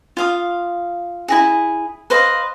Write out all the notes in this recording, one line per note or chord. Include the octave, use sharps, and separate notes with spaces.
F4 F5 D#6
E4 F#4 G#4
B4 C5 D#5 F5